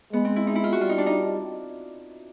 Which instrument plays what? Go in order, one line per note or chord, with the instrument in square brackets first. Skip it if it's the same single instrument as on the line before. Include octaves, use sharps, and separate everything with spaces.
[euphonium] G#3 [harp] B3
[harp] C4
E4
D#4
E4
F4
F#4
[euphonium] G3 [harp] F4
[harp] D#4
D4
D#4